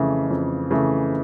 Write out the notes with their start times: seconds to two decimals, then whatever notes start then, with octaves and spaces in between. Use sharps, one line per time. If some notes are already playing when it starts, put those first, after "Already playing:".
Already playing: F2 C#3 E3 A3
0.30 F2
0.71 C#3 E3 A3